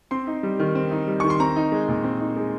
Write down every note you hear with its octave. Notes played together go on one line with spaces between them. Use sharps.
C4 C6
D#4
G3
D#3
C4
D#4
G3
D#3 C#6
C6
C4 A#5
D#4
G#3
A#2
C4
D#4
G#3